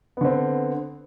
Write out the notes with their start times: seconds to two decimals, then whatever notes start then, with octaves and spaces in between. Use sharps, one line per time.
0.17 B3
0.21 D3
0.25 C4